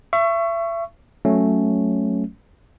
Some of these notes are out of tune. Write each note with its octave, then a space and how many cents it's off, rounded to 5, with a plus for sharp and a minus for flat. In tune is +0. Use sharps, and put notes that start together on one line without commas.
E5 +35 C#6 +0
F#3 +0 A3 +0 C#4 +0